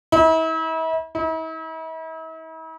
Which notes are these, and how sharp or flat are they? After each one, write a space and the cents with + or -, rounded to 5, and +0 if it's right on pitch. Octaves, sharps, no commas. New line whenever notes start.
E4 -40
E4 -45